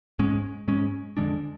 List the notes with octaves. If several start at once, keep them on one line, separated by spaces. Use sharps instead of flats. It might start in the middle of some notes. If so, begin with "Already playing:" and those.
G#2 G#3 C#4
G#2 G#3 C#4
F2 D3 G#3 D4